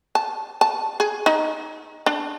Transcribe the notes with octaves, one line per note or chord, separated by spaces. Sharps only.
A5
A5
G#4
D#4
D4